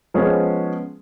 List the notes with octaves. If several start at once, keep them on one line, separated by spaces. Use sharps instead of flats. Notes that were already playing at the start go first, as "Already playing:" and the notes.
F3 G#3 B3 C#4 G#4